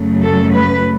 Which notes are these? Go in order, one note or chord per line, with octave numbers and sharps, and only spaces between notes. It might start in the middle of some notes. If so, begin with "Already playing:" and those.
Already playing: F#2 C#3 F#3 A3
A4
B4